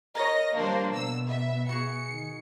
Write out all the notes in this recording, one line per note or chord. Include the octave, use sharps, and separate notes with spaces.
A#4 C#5 D#5 A#6
F3 G3 A#3 D4 C5
B2 B3 E6
E5
F#4 G#4 C#7
D#3